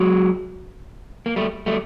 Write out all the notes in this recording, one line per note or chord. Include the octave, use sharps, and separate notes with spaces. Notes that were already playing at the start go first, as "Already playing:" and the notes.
Already playing: F#3 G#3
A#3
G3 A3
G3 A3